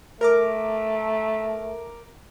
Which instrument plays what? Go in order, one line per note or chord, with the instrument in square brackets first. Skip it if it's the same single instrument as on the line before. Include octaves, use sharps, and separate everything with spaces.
[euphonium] A3 [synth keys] A#4 A#5 D6